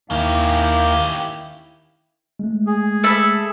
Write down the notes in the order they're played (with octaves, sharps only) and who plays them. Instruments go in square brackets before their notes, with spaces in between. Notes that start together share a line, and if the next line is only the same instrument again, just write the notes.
[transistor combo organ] D#2 A#3 [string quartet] D#3 E4 G5 [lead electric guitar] C#4 G4 [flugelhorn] F5
[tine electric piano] G#3 A3
[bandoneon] G#4
[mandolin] A4 E5 B5